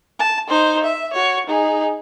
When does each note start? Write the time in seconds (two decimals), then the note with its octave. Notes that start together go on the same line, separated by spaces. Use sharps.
0.19 A5
0.47 D#4 C5
0.84 E5
1.13 F#4 C#5
1.47 D#4 G#4